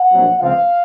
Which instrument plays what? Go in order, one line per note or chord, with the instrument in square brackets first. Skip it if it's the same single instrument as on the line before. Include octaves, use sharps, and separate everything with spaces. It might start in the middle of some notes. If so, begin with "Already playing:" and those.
Already playing: [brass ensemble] F#5
A#1 A#2 F#3 C4
C#2 C#3 F3 C4 F5